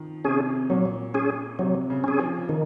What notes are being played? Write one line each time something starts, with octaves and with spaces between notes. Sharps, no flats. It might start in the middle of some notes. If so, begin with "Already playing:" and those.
Already playing: D#3 F3
C3 C#4 G#4
A#2 F#3
C#4 G#4
C3 F#3
C#3
C#4 G#4
F3
D#3 F3